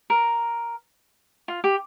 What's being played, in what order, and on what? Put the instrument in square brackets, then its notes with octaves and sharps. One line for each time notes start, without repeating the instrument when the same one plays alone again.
[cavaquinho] A#4
F4
G4